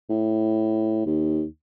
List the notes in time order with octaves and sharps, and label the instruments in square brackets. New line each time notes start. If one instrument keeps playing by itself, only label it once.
[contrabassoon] A2
D#2